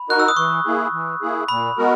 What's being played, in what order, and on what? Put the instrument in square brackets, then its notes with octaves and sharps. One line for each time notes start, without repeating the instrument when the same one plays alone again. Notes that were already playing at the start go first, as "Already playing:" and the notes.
Already playing: [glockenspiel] B5
[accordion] D#4 F#4 A#4 [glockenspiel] F#6
[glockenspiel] E6
D#6
[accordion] E3 [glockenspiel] C#6
[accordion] A#3 E4 G#4
E3
A#3 E4 G#4
[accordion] A#2 [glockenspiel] B5
[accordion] G#3 B3 F#4 A#4